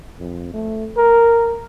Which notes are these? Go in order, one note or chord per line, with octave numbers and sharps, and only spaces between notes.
F2
A3
A#4